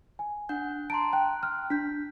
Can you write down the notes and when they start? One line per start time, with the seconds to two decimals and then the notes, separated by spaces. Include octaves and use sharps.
0.19 G#5
0.49 D4 F#5 G6
0.90 A5 A#5 C6 D7
1.13 G5 F#6
1.43 F6
1.70 D4 G6 B6